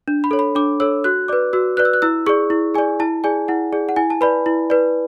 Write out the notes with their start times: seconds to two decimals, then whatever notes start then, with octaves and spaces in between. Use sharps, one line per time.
0.08 D4
0.24 B5
0.31 A4 C#5
0.39 B5
0.55 D4 D6
0.80 A4 C#5 E6
1.04 F#4 F#6
1.28 B4 D5 D6
1.53 F#4 E6
1.77 B4 D5 F#6
1.85 E6
1.93 F#6
2.02 E4 E6
2.26 G#4 D5 C#6
2.50 E4
2.75 G#4 D5 G#5
3.00 E4 A5
3.24 G#4 D5 G#5
3.48 E4 F#5
3.73 G#4 D5
3.89 F#5
3.96 E4 G#5
4.10 A5
4.21 B4 D5 B5
4.46 E4
4.70 B4 D5